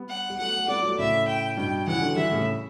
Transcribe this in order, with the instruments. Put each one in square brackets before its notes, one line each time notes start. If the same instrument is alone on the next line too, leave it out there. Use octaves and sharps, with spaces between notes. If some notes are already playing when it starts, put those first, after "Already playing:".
Already playing: [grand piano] G3 B3
[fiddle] F#5
[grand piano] G3
[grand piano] F#3 A3 [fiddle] F#5
[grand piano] A3
[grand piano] G3 B3 [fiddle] D5
[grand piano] F#3 A3
[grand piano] A2 C#3 [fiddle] E5
[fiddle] G5
[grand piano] G2 B2 [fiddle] G5
[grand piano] C#3 E3 [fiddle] F#5
[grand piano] D3 F#3
[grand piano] E3 G3 [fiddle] E5
[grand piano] A2 C#3